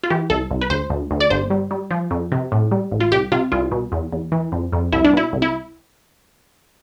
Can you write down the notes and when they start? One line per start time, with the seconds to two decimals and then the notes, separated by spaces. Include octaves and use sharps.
0.03 F4
0.10 E3 G4
0.30 C2 A4
0.51 C2
0.61 B4
0.70 D2 C5
0.90 D2
1.11 D2
1.20 D5
1.30 G1 C5
1.50 G3
1.71 G3
1.91 F3
2.11 F2
2.32 C3
2.52 A2
2.71 G3
2.91 A1
3.00 F4
3.12 C2 G4
3.32 C3 F4
3.52 C2 F4
3.71 B2
3.92 E2
4.13 E2
4.32 E3
4.52 F2
4.72 F2
4.92 C2 E4
5.05 D4
5.13 B2 E4
5.33 C2
5.42 E4